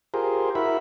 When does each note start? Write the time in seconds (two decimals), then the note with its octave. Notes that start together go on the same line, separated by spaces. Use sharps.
0.14 F4 G4 G#4 A#4 C5
0.55 E4 F#4 A#4 E5 B5